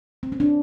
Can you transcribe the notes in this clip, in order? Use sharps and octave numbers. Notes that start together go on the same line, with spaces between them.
C4
C#4
D4